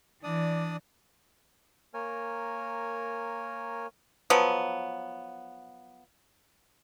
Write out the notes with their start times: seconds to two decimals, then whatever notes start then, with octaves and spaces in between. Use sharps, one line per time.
0.23 E3 D4 D5 D#6
1.94 A#3 A#4 C#5 G#5
4.30 F3 F#3 B3